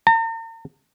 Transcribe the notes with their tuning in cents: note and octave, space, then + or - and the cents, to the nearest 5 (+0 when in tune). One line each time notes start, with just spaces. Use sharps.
A#5 -45